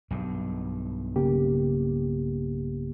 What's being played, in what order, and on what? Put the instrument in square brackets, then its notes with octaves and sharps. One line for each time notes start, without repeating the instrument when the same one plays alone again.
[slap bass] B1 G2
[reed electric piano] C#3 A#3 G4